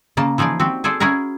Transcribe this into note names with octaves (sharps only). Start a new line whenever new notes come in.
C#3 A#3 A5
E3 F3 D#4 G#4 D5
C4 F#4 G4
G#4 A4 C5 D5
C#4 E4 F#4 G#4 A#4